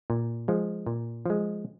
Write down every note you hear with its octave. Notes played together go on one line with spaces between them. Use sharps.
A#2
F3 G#3
A#2
F3 G#3